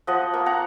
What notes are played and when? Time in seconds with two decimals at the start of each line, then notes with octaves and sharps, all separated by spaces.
0.07 F3 D#5 F#5
0.34 A#3
0.46 F#5 A#5